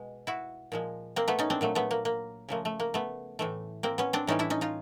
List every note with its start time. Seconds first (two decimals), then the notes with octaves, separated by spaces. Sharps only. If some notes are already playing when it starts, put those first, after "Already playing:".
Already playing: B2 G#3
0.27 E4 F#4
0.72 A#2 F3 G#3
1.16 A#3 C4
1.28 A3 B3
1.39 C#4 D#4
1.50 C4 D4
1.61 A#2 F#3 A3
1.75 A3 B3
1.91 A#3
2.05 A#3
2.49 C#3 F3 A3 A#3
2.65 A3
2.80 A#3
2.94 A3 B3
3.39 A2 E3 A3
3.83 A#3 C4
3.98 B3 C#4
4.13 C4 D4
4.27 A2 E3 G3 C#4 D#4
4.39 D4 E4
4.50 C#4 D#4
4.61 D#4 F4